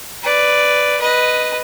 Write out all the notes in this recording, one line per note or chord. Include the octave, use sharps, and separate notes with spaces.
B4 D5
B4 D#5